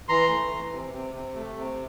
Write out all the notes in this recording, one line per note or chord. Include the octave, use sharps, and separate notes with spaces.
E3 A#5 C6
A3
E3
C3
C3
C3
A3
C3